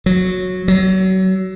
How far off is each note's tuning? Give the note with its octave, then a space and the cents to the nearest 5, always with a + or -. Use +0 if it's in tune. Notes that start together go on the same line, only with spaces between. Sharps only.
F#3 -10
F#3 +30